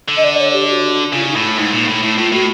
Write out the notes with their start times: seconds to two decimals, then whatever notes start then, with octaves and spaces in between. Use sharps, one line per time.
0.08 D3
0.17 D#5
0.24 D5
0.39 C#5
0.53 G4
0.68 F#4
1.13 C#3 F4
1.21 E4
1.28 D#4
1.35 A2 E4
1.57 G#2 D#4
1.73 A#2
1.88 A2
2.03 A2 E4
2.17 A2 F4
2.32 A2 F#4